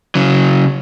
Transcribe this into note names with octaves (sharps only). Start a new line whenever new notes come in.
C#3 F#3